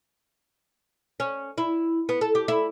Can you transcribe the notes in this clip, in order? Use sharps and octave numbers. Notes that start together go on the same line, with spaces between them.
C#4
E4
B3
A4
G4
E4